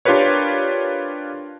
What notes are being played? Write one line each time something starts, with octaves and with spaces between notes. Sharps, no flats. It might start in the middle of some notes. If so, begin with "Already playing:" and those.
D4 F4 G4 A#4 B4 C#5